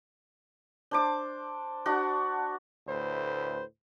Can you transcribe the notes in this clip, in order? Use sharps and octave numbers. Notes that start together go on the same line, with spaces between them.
D4 C5 D6
D4 F#4 F#5
D2 A2 B4 C5